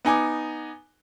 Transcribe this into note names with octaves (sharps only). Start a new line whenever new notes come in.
B3 D#4 G#5 D6